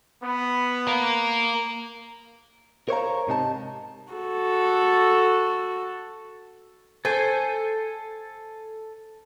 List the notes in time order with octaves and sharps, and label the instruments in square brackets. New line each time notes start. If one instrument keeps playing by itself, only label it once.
[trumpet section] B3
[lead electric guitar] A#4 F5
[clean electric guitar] A#4 C5 C#5 E5 F5 A#5
G#2 C3 D#4 A5
[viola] F#4 A4
[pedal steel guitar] A4 G#5 [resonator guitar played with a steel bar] C5